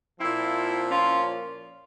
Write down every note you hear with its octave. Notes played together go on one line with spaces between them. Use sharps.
A#2 F3 C4 E4
C#4 F4